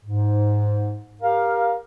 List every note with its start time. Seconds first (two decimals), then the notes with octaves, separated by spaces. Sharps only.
0.05 G#2
1.22 G4 A#4 F5